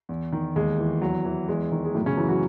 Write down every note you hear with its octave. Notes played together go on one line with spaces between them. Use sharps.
E2
D#3
D#2 G#3
E3
E2 F#3
E3
E2 G#3
D#3
G#3
F#2 A2 A3
C#3 C#4
F#2 E3 E4
F#3 F#4